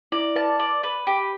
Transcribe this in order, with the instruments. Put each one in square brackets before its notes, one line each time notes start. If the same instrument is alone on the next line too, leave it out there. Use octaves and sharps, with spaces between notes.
[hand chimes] E4 [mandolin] D5
[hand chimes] B4 [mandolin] A5
[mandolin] D5
B4
G4